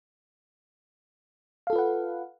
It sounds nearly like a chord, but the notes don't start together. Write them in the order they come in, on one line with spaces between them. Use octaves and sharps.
F5 A4 F4 B4 F#5